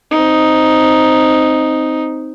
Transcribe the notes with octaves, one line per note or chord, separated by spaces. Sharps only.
C4 D#4